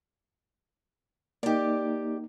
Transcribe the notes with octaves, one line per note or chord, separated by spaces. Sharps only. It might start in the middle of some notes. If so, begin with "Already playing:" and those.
A#3 D#4 G4 D5